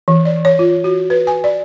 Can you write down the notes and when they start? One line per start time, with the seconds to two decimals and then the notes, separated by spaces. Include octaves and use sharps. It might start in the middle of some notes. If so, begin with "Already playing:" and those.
0.08 E3
0.25 D5
0.45 C#5
0.59 F4
0.84 F#4
1.10 B4
1.27 G#5
1.44 D5